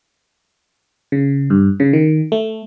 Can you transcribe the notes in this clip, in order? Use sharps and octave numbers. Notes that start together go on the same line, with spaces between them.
C#3
G2
C#3
D#3
A3